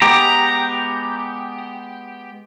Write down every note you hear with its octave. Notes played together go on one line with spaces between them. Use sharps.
G#3 B3 G4 A#5